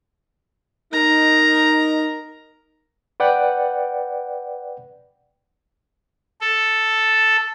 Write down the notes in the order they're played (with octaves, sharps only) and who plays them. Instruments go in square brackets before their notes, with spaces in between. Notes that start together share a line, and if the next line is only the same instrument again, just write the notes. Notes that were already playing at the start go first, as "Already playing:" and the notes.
[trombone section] D#4 [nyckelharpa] A#4 A#5
[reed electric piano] B4 D5 F#5 G5
[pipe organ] A4